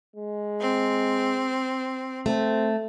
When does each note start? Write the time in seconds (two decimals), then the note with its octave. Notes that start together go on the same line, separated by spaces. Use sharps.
0.16 G#3
0.61 C4
2.26 A3 C4